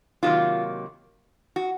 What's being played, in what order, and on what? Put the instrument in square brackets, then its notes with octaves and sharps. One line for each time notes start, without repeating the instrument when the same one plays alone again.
[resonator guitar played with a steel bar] C3 D#3 F#3 A#3 F4
F#4